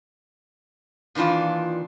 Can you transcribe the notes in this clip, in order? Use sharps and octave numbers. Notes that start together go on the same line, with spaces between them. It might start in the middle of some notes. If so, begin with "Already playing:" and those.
A#2 D#3 E3 D4 F4